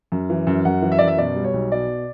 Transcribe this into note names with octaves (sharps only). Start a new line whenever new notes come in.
F#2
E3
F#2
F#2 F#5
E3
E5
F#2 D5
E5
B2 D5
G3
C#5
B1
B2 D5